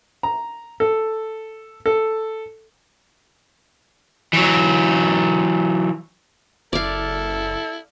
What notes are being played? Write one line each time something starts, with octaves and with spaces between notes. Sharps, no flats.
A#5
A4
A4
E3 F#3
F#1 E4 A4 D5 F5